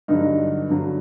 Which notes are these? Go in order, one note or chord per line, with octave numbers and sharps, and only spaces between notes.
G2 D3 F#3 D#4
G2 D3 F#3